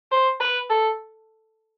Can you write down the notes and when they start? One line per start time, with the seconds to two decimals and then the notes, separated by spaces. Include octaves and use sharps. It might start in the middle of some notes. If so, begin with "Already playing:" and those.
0.12 C5
0.40 B4
0.70 A4